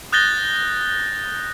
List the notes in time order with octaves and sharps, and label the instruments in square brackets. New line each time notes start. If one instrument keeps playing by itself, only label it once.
[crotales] D#6 F#6 G6 A6 A#6 G7